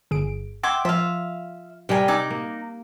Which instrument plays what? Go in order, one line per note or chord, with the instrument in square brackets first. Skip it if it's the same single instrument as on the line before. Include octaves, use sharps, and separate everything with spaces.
[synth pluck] G1 G#4 D7
[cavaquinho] E5 G5 D6 [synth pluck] F#5 C6 G#6
[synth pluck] F3 [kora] F4 [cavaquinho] E5 F5
[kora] C3 G3 A#4 [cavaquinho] G5 G#5
[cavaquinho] D#4 D6 [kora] F#5 [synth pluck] E6 G#6
[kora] A#3